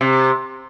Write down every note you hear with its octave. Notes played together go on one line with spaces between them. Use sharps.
C3